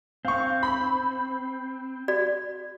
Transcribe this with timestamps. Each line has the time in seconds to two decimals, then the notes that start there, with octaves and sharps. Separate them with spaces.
0.25 C4 F5 C#6
0.63 B5
2.08 F#4 D5